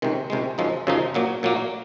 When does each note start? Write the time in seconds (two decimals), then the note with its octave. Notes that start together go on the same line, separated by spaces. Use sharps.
0.02 C#2 C3 D#3 G#3
0.30 C#2 C3 D#3 G#3
0.58 F#2 C#3 F3 G#3 D#4
0.87 F#2 C#3 F3 G#3 D#4
1.14 A#2 F#3 A#3
1.43 A#2 F#3 A#3